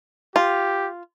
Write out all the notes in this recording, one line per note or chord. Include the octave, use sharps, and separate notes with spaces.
F4 G4